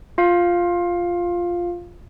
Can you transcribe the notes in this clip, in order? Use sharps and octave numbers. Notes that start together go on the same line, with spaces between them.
F4 F5